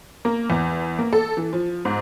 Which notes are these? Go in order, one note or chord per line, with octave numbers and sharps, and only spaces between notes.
A#3
E2
A#3
A4
E3
F3
G#2